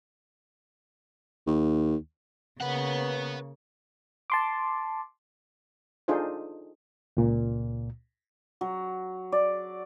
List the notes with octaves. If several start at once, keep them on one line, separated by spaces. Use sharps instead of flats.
D#2
C#3 A#3 B4 C#5 F#5
A5 C6 D6
D4 D#4 F4 G#4 A4 C5
C#2 A#2
F#3
D5